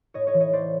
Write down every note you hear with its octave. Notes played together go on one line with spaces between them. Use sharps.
A2 C#5 D#5
C#5 D#5
E3
C#5 D#5
A1 C5 D5